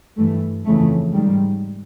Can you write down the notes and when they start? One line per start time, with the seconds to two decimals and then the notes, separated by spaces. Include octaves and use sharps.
0.18 G2 E3 A3
0.65 F2 C#3 E3 A3
1.13 G#2 D#3 G3